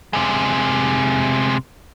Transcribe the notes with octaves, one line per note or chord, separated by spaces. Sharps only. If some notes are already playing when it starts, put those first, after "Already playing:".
C3 G#3